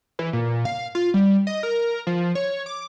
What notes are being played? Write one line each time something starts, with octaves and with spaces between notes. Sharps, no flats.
E3
A#2
F5
F4
G3
D#5
A#4
F3
C#5
D6